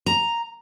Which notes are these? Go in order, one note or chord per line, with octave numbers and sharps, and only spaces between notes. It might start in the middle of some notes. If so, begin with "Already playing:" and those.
A#5